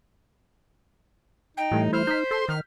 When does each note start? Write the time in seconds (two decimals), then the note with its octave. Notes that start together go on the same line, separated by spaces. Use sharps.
1.57 D#4 G5
1.72 A2 E3 G3 A3
1.93 E4 C5 F6
2.07 D#4 G6 B6
2.31 A4 C6
2.49 D#3 F6